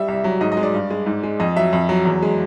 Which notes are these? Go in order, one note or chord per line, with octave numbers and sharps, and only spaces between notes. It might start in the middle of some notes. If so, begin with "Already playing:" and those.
Already playing: G3 E5
C2
F#3
G#2 D#5
D#5
G#3
D5
G2
G#3
G#2
G#3
F2 D#5
F#3 E5
F2
F#3
E2
G#3